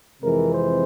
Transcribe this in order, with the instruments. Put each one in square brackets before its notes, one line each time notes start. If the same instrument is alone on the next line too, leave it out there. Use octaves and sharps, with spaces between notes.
[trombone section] F2 C3 E3 G#3 A#4
C5